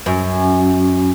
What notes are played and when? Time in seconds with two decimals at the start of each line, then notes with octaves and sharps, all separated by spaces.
0.06 F#2